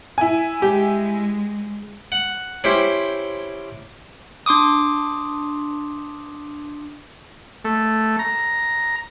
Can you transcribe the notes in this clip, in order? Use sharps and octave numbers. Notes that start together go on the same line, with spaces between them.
E4 G#5
G#3 G4
F#5
C#4 E4 G4 C5
D4 C6 D6 D#6
A3
A#5